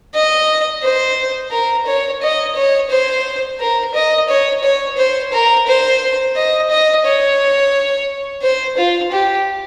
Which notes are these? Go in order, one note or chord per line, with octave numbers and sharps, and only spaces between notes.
D#5
C5
A#4
C#5
D#5
C#5
C5
A#4
D#5
C#5
C#5
C5
A#4
C5
D#5
D#5
C#5
C5
F4
G4